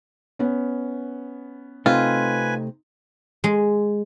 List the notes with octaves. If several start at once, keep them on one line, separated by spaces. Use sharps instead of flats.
B3 C#4
C3 A3 C4 D#4 F4 B4 G#5
G#3